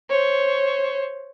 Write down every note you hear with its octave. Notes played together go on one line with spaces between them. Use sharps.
C5 C#5